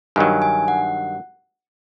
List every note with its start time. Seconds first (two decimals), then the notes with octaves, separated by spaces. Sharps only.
0.16 G2 D#3 F#3 G#5
0.42 G#5
0.68 F#5